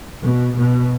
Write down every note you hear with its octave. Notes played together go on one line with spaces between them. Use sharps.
B2
B2